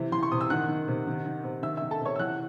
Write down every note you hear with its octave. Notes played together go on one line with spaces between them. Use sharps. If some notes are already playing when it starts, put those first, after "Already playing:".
Already playing: C3 E3 E5
E3 C6
C#6
C3 D#6
E6
D#3 F#5 F#6
D#3
C3
D#3
D#3
C3
D#3 E5 E6
D#3 E5 E6
A4 A5
C3 C#5 C#6
E6
E3 F#5 F#6